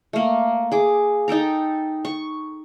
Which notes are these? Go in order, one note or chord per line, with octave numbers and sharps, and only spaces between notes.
A3 A#3
G#4 D6
D#4 A4 G5 A#5
C#6